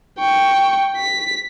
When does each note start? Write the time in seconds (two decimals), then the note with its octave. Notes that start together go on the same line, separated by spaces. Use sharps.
0.19 G5 C#6
0.96 B6